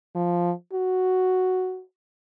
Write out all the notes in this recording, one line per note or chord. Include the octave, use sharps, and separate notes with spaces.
F3
F#4